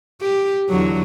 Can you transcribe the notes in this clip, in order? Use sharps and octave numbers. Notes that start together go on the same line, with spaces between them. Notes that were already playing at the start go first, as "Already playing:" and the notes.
G4
E2 D3 F#3